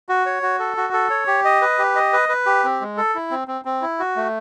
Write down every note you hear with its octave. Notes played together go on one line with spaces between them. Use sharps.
F#4
C#5
F#4
A4
F#4
A4
C#5
G4
D#5
B4
G4
D#5
B4
B4
G4
C4
G#3
A4
E4
C4
C4
C4
E4
F#4
A3